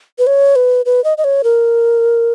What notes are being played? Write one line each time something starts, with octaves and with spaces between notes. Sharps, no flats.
B4
C#5
B4
B4
D#5
D#5
C#5
A#4